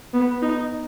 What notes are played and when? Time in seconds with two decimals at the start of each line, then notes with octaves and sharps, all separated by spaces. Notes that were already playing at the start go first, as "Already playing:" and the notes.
0.14 B3
0.42 D#4